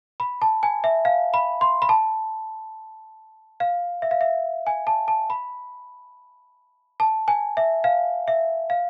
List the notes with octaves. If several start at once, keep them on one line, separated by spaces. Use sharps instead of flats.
B5
A5
G#5
E5
F5
B5
C6
B5
A5
F5
E5
F5
E5
G#5
A5
A5
B5
A5
G#5
E5
F5
E5
F5